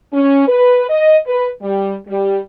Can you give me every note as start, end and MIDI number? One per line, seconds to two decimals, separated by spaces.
0.13 0.47 61
0.47 0.88 71
0.89 1.16 75
1.27 1.48 71
1.62 1.94 55
2.07 2.39 55